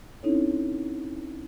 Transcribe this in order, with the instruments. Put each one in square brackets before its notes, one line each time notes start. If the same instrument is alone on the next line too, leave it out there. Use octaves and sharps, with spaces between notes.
[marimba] C4 C#4 D#4 E4 A4 C#5